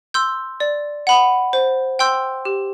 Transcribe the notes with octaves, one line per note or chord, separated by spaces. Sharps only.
C6 E6 G6
D5
F#5 B5
C5
G5 C6 E6 G6
G4